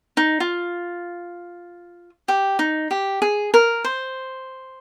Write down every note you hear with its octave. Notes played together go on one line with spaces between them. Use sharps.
D#4
F4
G4
D#4
G4
G#4
A#4
C5